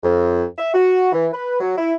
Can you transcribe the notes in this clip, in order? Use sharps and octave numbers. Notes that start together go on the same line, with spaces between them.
F2
E5
F#4
E3
B4
F#3
E4